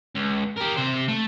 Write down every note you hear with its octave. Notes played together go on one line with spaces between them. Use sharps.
C#2
G4 A#4
C3 C5
A3